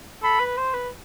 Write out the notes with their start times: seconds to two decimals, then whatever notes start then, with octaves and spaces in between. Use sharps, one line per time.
0.22 A4 B5
0.40 B4
0.57 C5
0.74 B4